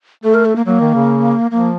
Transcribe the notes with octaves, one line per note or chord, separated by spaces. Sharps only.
A3 A4
A#4
A4
A#3
F#3 A#3
D#3
C#3
F3 A#3